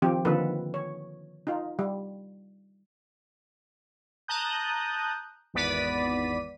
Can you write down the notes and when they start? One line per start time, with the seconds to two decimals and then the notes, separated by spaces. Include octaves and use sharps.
0.02 D#3 F3 C4 G4
0.25 D3 D#3 F3 A#3 A4 B4
0.74 C#5
1.47 D#4 F4
1.79 G3
4.28 A5 A#5 D#6 F#6 G6
5.54 G#1 E2 B3 D5 B6 D#7